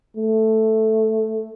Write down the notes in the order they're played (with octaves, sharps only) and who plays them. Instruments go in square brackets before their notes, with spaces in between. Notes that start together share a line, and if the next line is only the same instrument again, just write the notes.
[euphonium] A3